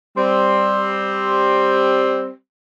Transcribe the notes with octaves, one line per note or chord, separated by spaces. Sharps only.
G3 C4